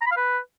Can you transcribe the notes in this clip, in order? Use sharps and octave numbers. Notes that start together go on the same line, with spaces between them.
A#5
B5
F5
B4